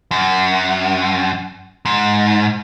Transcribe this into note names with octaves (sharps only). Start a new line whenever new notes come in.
F#2
G#2